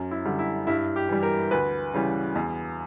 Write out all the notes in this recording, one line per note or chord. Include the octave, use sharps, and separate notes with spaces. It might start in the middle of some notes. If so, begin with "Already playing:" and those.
Already playing: F#2
E4
D3 G3
E4
G2 E4
G4
E3 G3
A#4
D2 B4
C#3 E3 G3
E2